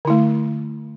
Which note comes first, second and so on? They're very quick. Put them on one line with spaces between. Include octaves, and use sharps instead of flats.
D3 E4 A3